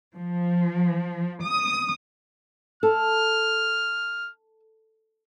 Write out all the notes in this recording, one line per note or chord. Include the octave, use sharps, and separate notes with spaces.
F3
D#6
A4 F6